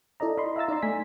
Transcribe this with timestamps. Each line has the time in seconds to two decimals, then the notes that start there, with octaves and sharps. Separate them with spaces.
0.20 E4 A4 D5 D#5 A#5
0.38 D#5 B5 C6
0.56 E5 F5 A#5 E6 A6
0.68 D#4 D5 A#5 C6
0.82 A3 G#5 B6